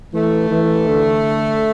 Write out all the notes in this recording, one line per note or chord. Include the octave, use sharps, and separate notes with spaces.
E3 A3
E3
D3